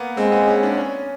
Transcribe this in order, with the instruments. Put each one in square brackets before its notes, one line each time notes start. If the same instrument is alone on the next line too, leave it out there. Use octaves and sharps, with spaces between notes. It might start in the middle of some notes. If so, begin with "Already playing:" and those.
Already playing: [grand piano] A#3 B3
[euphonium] G#3 [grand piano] C4
[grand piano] B3
C#4
D4
C#4